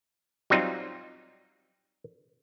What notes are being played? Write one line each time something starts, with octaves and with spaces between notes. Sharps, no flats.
F#3 G3 C4 D#4 F4